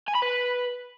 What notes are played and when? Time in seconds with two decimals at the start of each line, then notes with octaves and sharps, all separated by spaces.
0.08 G#5
0.15 B5
0.23 B4